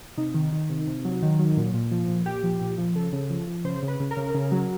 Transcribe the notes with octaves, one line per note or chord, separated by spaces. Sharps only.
C3 D#4
D#3
D#3
C3
C3
F#3
D#3
F#3
A#2
A#2
F3
A#2
A#2 G4
F3
A#2
F3
C#3 A4
C#3
F3
F3
C#3 C5
C#3
B4
C#3
A#4
C#3
C#3
F#3